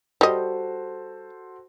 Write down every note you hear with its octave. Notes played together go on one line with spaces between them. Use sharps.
G3 F#4 A4 C5 D#5